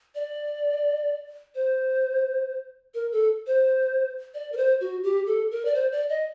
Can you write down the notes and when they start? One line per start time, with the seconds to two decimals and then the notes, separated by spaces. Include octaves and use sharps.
0.15 D5
1.55 C5
2.94 A#4
3.12 A4
3.47 C5
4.34 D5
4.52 A#4
4.57 C5
4.81 F#4
5.04 G4
5.27 A4
5.51 A#4
5.65 D5
5.75 C5
5.92 D5
6.09 D#5